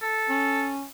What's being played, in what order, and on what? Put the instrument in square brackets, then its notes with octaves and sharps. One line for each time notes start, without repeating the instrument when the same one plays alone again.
[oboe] A4
[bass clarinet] C#4